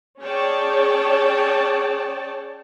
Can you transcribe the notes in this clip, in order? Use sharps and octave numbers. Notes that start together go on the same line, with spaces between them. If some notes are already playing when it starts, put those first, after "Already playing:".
C#4 G#4 C#5 D5 G5 A5